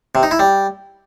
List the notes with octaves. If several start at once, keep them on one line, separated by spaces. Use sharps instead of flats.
C3
D#4
E4
G3